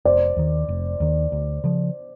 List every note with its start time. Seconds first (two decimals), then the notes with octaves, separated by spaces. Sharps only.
0.05 F1 C5 D5
0.37 D#2 D#3
0.69 F1
1.00 D#2 D#3
1.32 D2
1.64 C#3 F3